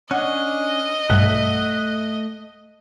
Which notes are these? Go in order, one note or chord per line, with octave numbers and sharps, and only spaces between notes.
C#4 D4 D#5 F#5
B1 G2 A3 E5 F#5